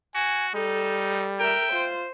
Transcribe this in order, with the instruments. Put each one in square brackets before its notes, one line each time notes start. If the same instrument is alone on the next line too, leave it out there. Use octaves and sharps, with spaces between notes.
[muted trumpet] F#4 [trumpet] G#5
[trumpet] G3 [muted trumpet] D#4 [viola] A4
[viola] A#4 E5 [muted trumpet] G5
[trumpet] F4 [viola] C5